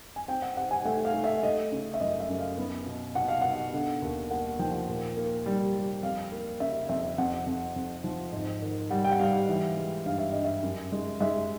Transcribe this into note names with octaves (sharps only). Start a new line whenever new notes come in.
G#5
C4 G5
F#5
C4 F#5
G#5
A3 F#5
F5
A3
E5
A3 D#5
C#3
E5
F#2 D#5
E5
F#2
F5
B3
B2
B2 F#5
F5
B2 F#5
D3
D#2
A#3 F#5
F3 G5
A#2
A#3
G3
G3
F2 F5
A#3
C#3 E5
F2 E5
F2 F#5
F2
F2
F3
G#2
D#3
G3 F#5
G5
F#5
G3 F5
E3
G#3
G2 F5
E5
G2 D#5
E5
F#2
G#3
G#3 E5